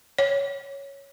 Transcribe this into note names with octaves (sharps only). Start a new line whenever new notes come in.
C#5